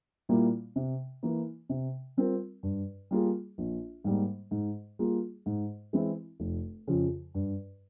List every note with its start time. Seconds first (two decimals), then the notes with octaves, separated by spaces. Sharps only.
0.29 A#2 G3 A#3 E4
0.76 C3
1.23 E3 A#3
1.69 C3
2.17 G3 C4 F4 A#4
2.63 G2
3.11 G3 A#3 F4 G#4
3.58 A#1
4.04 G#2 G3 A#3
4.51 G#2
4.99 G3 A#3 F4 G#4
5.46 G#2
5.93 E3 G#3 C4 E4
6.40 F1
6.87 F2 C#3 F3
7.35 G2